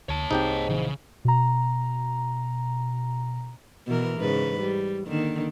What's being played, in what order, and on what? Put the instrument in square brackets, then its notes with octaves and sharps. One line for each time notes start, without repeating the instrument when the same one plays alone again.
[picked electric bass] D2 [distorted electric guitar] C#5 A5
[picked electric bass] C2 C4 [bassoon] G#2 [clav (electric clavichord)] D#4 G4 G5
[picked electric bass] A#1 E3 [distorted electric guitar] C#3
[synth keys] B2 A#5
[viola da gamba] B2 E3 A#4
G#2 C#3 B4
G3
D3 D#3 A#3